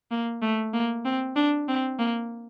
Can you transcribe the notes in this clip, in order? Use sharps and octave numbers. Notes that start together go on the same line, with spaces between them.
A#3
A3
A#3
C4
D4
C4
A#3